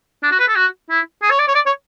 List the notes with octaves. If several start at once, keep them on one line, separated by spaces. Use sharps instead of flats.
D4
F#4
B4
A4
F#4
E4
G#4
C#5
D5
C#5
D5
C#5